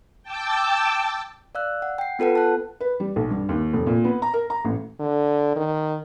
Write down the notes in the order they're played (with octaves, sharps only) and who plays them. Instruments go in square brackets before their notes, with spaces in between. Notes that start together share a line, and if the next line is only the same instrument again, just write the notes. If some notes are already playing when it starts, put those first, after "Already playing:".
[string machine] G5 A5 D6 E6
[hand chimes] D5 F5 E6 F#6
F#5
G5 C7
B3 F4 A4 B4 F#5
A5 F#6
[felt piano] B4
G3
B1
G2
D#2
F1
A#2
B3
A#5
A#4
A#5
A1
[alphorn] D3
D#3